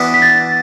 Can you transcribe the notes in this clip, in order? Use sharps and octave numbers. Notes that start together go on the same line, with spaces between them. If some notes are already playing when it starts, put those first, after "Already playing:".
Already playing: E3 B3 D4 F#4 B6
B6
A6